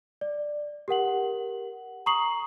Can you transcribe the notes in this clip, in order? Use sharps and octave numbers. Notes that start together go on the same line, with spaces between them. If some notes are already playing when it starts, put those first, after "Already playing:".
D5
G4 A#4 F#5 F#7
A#5 C#6 D#6 C7 F#7